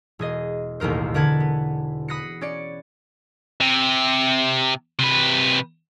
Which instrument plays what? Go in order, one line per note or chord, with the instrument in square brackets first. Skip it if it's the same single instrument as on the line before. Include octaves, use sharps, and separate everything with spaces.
[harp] E1 G#4 D#5
E1 A1 D#2 A#4 C5
D3 A#4 B4 F#5 A5 G#6
B3
B5 D#6 F#6 A#6 C7 C#7
C#4 D5 C#7
[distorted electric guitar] C3
C3 B4